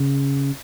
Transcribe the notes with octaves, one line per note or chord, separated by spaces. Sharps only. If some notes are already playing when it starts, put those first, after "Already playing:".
Already playing: C#3